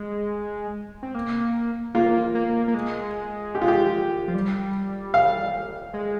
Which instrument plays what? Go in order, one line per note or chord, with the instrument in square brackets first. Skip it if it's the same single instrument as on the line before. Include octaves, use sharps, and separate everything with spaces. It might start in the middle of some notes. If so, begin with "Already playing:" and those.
Already playing: [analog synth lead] G#3
C4
A#3
[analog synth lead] A#3 [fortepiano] F4
[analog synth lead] A#3
A#3
G#3
[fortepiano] G4
F4
G4
[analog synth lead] F3
G3
[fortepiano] F5
[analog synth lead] G#3